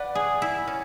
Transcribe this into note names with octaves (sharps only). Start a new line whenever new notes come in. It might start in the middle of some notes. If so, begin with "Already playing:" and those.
Already playing: B4 D5 F#5
G#4
E4
C#4